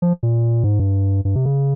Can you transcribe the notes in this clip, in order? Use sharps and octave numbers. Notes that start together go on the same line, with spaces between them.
F3
A#2
G#2
G2
G2
C3
C#3